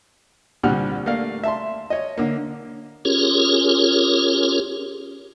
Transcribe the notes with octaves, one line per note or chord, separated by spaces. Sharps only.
C2 A#2 D3 G3 F#5 F6
A3 A#3 D5 F5
E5 A5 C6
C#5 D#5
D3 A#3
C#4 F4 G4 G#4 A#4 C#5